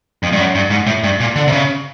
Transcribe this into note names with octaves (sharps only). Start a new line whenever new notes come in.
F2
G2
F#2
G2
G#2
A2
G2
A#2
D3
C3
C#3